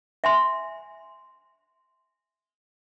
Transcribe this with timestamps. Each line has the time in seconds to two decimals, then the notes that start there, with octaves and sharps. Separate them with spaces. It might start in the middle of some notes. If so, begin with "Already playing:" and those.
0.24 E5 G#5 C6